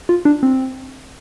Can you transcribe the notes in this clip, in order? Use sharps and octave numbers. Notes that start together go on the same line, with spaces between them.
F4
D4
C4